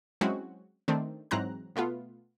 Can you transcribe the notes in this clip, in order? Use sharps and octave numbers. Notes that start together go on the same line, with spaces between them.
F#3 G#3 C4 C#4 E4 F#4
D#3 A3 C4 D4
G#2 E3 F#3 C4 A#5 F#6
B2 A3 B3 F4